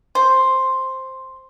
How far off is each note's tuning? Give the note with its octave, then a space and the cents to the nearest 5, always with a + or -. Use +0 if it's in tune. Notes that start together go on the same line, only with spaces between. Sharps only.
C5 +5